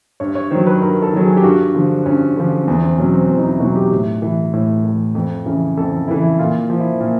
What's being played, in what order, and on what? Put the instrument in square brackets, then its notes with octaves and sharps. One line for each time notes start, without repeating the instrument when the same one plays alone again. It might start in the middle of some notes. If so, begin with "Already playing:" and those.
[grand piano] G2 C#5
C#5
D#3 F#3 C5
B4
G2 A#4
A4
D#3 F#3
G#4
G4
G2 F#4
D3 F3
G2 C#4
D3 F3
C4
E2 B3
C4
B2 F#3 C#4
C4
E2 C4
D#4
E4
B2 F#4
F#3
G4
A2
E3
A2
E3
F2
C#3 E3
F2 A4
A4
C#3 E3 E4
E4
A#2 F4
F3
E4
A#2